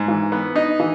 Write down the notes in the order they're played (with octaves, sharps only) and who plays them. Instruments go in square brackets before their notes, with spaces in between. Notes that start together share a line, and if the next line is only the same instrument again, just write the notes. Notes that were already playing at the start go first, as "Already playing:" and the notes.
Already playing: [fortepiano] G#2
E3
B3
D#4
E3